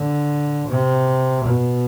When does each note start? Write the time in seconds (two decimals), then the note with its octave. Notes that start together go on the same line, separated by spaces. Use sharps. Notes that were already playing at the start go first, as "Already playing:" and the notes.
Already playing: D3
0.69 C3
1.45 B2